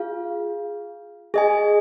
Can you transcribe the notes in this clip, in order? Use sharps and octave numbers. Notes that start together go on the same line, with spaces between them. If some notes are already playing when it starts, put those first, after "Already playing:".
Already playing: F4 G#4 F5
G#4 D#5 G#5